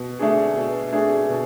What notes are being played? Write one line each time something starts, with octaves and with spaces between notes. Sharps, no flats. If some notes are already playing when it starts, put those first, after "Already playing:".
Already playing: B2
A3 D4 G#4
B2
A3 D4 G#4
B2